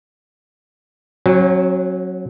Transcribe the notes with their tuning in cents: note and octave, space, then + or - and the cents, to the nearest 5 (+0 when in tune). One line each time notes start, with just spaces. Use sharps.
F#3 -5 C#4 -45